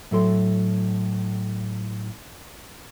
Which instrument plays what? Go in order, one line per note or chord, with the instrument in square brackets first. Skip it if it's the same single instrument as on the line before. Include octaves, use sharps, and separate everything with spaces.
[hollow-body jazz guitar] A2 F#3 A4 C6